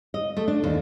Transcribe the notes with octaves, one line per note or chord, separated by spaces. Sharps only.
D#5
A3
D4
D#2